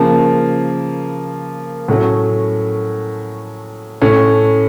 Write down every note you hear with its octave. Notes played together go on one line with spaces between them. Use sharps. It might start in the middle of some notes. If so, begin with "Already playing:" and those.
Already playing: C#3 F3 A#3
A2 F#3 A3 C#4
A2 A3 C#4